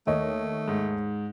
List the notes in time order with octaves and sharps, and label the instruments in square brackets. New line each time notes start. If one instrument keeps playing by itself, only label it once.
[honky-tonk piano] D#2 C#5 D#5 [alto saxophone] A3
[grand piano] G#2